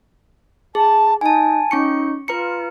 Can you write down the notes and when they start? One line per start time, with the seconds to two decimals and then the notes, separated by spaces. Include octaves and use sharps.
0.75 G#4 A5
1.21 D#4 G#5 A5
1.71 C#4 D#4 C#6 C#7
2.28 F4 B4 A#5 C#7